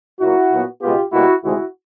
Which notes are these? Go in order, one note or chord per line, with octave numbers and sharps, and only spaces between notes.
A#2 F#3 A#3 E4 F#4
A#2 F#3 B3
C#2 B2 G#3 B3 F4 G4
B2 G3 A#3 E4 F#4
D2 C3 D#3 G#3 E4 F#4